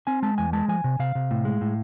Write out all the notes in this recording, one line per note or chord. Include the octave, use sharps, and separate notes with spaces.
C4 G#5
G#3 A5
E2 G#5
G#3 A5
F3 G#5
C3
C3 F5
C3
A2
G#3
A2